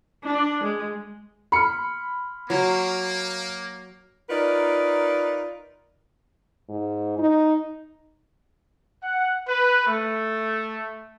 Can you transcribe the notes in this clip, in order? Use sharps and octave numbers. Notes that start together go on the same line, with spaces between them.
D4
G#3
B5 C6 F6 C#7
F#3 A#3
D#4 F4 A#4 B4 D5 D#5
G#2
D#4
F#5
B4
A3